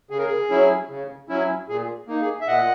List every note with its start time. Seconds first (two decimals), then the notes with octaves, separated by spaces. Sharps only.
0.10 C#3 G#4
0.18 A#4
0.26 G#4
0.50 F#3 C#4 E4
0.89 C#3
1.29 F#3 C#4 E4
1.68 A#2 G#4
2.08 A#3 D#4
2.21 G#4
2.41 E5
2.47 A#2 D#5 F#5